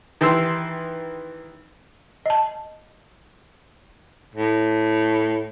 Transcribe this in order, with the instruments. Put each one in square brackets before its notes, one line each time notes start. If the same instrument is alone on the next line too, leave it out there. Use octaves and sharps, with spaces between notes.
[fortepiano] D#3 E3 G4 C6 E6
[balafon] D#5 A5
[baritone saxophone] A2